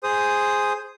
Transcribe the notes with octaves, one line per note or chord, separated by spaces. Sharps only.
G#4 C5 D#6